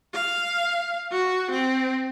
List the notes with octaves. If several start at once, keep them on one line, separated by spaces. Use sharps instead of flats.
F5
F#4
C4